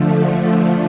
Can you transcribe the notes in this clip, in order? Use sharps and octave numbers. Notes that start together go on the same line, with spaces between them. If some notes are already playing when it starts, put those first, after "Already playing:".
Already playing: D3 F3 A3